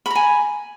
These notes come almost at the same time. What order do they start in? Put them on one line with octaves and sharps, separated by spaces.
B5 A#5 G#5